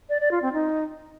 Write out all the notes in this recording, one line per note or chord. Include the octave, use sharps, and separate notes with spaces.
D5
D5
F4
C4
D#4